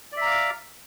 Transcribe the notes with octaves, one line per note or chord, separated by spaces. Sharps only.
D5 E5 F5 A#5 D6